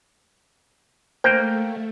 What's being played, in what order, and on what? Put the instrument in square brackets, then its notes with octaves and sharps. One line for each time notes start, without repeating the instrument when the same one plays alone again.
[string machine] A3 [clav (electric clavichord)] A#3 G5 [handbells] C5 G6